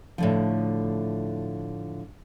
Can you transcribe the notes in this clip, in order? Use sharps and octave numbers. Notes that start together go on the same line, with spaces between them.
A2 D3 F3